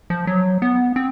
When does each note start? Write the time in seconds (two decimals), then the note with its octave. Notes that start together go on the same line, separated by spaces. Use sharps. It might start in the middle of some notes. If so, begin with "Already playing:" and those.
0.10 F3
0.27 F#3
0.62 B3
0.96 C4